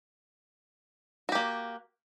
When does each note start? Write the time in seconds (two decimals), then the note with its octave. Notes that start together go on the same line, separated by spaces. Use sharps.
1.29 F#4
1.32 G4
1.35 A#3